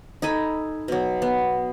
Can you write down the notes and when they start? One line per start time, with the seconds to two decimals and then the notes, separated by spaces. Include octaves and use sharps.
0.22 D#4 A4 G#5 B5
0.88 B2 F#3
1.22 B3